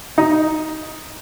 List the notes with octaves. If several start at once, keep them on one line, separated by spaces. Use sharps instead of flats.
D#4